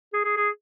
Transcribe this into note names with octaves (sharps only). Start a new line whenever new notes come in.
G#4
G#4
G#4